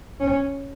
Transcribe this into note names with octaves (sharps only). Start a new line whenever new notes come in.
C#4